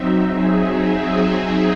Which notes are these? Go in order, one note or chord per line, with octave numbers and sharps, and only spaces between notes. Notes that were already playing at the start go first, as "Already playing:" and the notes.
Already playing: F#3 C4 D#4 E5
G#4